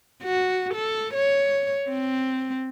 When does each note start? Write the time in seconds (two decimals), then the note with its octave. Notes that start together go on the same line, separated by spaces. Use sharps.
0.23 F#4
0.74 A4
1.14 C#5
1.89 C4